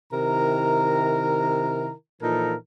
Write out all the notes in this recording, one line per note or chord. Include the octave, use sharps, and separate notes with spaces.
C3 D#3 E4 A#4 A#5
A#2 E3 F3 D#4 A4 A#4